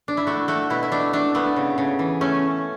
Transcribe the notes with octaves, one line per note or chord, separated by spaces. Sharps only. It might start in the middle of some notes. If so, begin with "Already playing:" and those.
D4
E4
A3 F#4
A3 F#4
B2 E4
E4
A3 D4
A3 D4
A3 B3
C#3
C#3
E3
A3 C#4